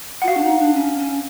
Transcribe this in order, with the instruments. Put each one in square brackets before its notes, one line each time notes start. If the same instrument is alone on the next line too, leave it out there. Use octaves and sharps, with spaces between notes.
[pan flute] F4 [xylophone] F#5
[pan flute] F#4 [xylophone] F5
[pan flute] D4
D#4
D4
C#4
C#4